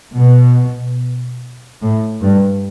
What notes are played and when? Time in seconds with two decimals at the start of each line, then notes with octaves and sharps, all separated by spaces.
0.17 B2
1.82 A2
2.23 G2